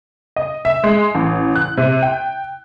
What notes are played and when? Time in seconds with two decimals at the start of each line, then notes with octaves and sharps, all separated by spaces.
0.36 D#5
0.65 E5
0.84 G#3
1.15 A1
1.56 F#6
1.77 C3
2.02 G5